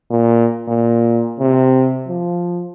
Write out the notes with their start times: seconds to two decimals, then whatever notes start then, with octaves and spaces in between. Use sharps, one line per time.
0.11 A#2
0.69 A#2
1.40 C3
2.07 F3